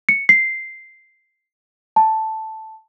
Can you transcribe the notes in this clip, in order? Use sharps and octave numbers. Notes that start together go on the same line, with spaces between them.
C#7
C7
A5